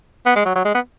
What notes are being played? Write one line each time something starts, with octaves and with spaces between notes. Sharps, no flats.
B3
G#3
F#3
F#3
G#3
B3